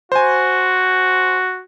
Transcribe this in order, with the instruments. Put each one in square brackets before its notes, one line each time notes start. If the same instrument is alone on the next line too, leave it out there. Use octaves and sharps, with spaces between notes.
[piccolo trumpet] F#4 [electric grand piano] C5 G#5